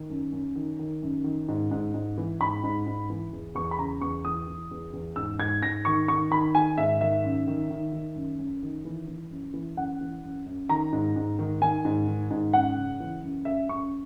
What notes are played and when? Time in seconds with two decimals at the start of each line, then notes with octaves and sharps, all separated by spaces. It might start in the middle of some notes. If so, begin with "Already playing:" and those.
Already playing: D#3
0.10 F#2
0.32 F#2
0.55 D#3
0.79 D#3
1.02 F#2
1.24 D#3
1.48 G#2
1.71 G#2
1.94 G#2
2.18 E3
2.41 G#2 B5
2.63 G#2
2.86 G#2
3.10 E3
3.33 E2
3.55 E2 C#6
3.71 B5
3.78 C#3 A#5
4.01 E2 C#6
4.25 E3 D#6
4.48 E3
4.71 E2
4.93 E2
5.16 G#2 E6
5.39 G#2 G#6
5.62 G#2 A#6
5.85 D#3 C#6
6.08 D#3 C#6
6.31 D#3 B5
6.55 D#3 G#5
6.78 G#2 E5
7.01 D#3 E5
7.24 F#2
7.47 D#3
7.70 D#3
7.92 D#3
8.16 F#2
8.38 F#2
8.63 D#3
8.85 E3
9.08 E3
9.31 F#2
9.54 E3
9.77 F#2 F#5
10.01 E3
10.24 F#2
10.46 F#2
10.69 D#3 A#5
10.93 G#2
11.16 G#2
11.39 D#3
11.61 D#3 G#5
11.85 G#2
12.07 D#3
12.31 G#2
12.53 F#2 F#5
12.77 C#3
13.00 E3
13.23 F#2
13.45 F#2 E5
13.69 F#2 C#6